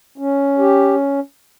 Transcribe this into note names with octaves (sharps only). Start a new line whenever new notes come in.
C#4
G4